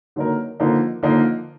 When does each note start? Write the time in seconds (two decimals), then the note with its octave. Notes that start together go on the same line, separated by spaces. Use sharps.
0.16 D3 F#3 A#3 D#4 A#4
0.60 D3 F3 A#3 D#4 A#4
1.03 D3 F3 A#3 D#4 A#4